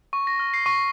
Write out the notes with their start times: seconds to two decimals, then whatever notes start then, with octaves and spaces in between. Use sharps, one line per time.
0.13 C#6
0.27 A#6
0.39 F6
0.54 C7
0.66 C#6